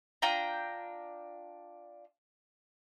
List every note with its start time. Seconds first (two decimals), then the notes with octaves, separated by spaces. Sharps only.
0.22 D4 F4 G5 A#5